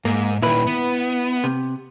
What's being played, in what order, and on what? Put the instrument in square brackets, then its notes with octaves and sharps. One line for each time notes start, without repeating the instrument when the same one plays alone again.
[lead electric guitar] G#2 [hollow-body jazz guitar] A#3
[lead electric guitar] A#2 D#3 [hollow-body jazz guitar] E4 B4
[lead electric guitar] B3
[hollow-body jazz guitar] C3